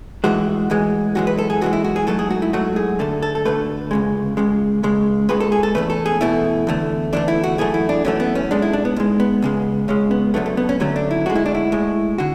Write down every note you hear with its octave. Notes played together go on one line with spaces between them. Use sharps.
A2 E3 G#3 F#4
A2 E3 G#3
F#2 E3 G#3 F#4
B4
A4
G#4
F#2 E3 G#3 F#4
E4
F#4
G#4
G#2 F#3 A3 A4
G#4
F#4
E4
G#2 F#3 A3 F#4
G#4
D2 D3 A3 A4
A4
A4
D2 D3 A3 B4
C#2 C#3 G#3
C#2 C#3 G#3
C#2 C#3 G#3
C#2 C#3 G#3 B4
A4
G#4
A4
E2 B2 A3 B4
A4
G#4
E2 B2 A3 E4
E2 D3 A3
E2 D3 A3 D4
E4
F#4
F#2 E3 A3 G#4
E4
D4
F#2 E3 A3 C#4
B3
C#4
G#2 G#3 D4
E4
D4
B3
G#2 G#3
B3
C#2 C#3 G#3
C#2 C#3 G#3 C#4
B3
D2 D3 F#3 A3 B3
A3
B3
C#4
D2 D3 F#3 A3 C#4
D4
E4
A2 G#3 F#4
E4
D4
E4
A2 G#3
D3 F#4